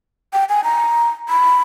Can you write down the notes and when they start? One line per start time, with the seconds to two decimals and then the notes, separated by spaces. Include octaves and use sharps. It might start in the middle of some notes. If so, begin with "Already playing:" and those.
0.33 G5
0.49 G#5
0.64 A#5
1.29 B5